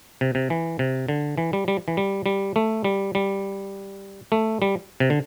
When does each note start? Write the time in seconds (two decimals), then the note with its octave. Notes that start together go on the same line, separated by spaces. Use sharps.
0.21 C3
0.35 C3
0.50 E3
0.79 C3
1.08 D3
1.38 E3
1.53 G3
1.68 G3
1.88 E3
1.97 G3
2.26 G3
2.56 A3
2.84 G3
3.15 G3
4.32 A3
4.62 G3
5.00 C3
5.10 D3